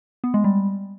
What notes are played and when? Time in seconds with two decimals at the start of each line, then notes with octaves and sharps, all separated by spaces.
0.24 B3
0.34 G#3
0.44 G3